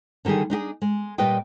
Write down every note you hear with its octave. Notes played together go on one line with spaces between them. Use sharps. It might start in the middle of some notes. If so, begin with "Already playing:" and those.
D3 D#3 G3 G4 G#4
D4 D#4 G4 G#4
G#3
A#2 G3 G4 B4 D#5 G5